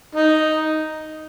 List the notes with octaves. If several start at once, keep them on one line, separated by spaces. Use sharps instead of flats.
D#4